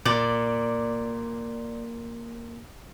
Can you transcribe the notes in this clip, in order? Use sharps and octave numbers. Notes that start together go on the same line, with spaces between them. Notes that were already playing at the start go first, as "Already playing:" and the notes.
A#2 D5